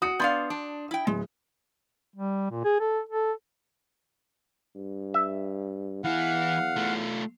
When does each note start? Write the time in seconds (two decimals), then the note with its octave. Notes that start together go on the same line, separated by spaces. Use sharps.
0.02 F#4 D#6 C#7
0.19 B3 D4 D5 F5 C6 G6
0.50 D4
0.91 E4 G5
1.07 D1 G#3
2.16 G3
2.51 A#2
2.65 G#4
2.80 A4
3.09 A4
4.76 G2
5.14 E5
6.04 E2 E3 E4 F5 F#5
6.76 A3 F4